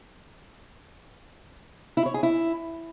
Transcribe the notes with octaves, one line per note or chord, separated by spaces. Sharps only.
E4
C#5
G#4
E4